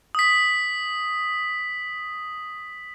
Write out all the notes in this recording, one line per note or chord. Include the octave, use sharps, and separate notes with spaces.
D#6 B6